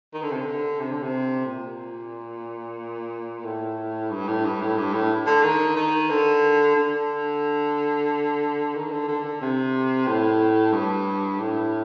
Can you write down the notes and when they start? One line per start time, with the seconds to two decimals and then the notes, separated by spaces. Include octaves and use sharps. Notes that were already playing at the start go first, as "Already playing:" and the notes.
0.14 D#3
0.23 D3
0.32 C3
0.41 D3
0.80 C3
0.92 D3
1.03 C3
1.46 A#2
3.44 A2
4.11 G2
4.28 A2
4.45 G2
4.61 A2
4.77 G2
4.93 A2
5.26 D3
5.43 D#3
5.76 D#3
6.10 D3
6.76 D3
8.75 D#3
8.91 D3
9.08 D3
9.24 D3
9.41 C3
10.07 A2
10.73 G2
11.39 A2